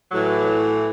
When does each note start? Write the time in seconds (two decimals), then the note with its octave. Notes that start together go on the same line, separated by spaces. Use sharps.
0.11 A2 E3 F#3